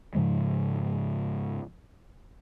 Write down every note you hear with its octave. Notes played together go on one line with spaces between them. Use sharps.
G#2 C#3 F3 G#3